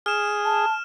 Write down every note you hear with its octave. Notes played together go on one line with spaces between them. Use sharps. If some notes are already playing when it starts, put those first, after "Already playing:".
G#4 F6 E7
A5